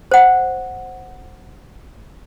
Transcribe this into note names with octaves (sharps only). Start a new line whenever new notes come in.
C5 F#5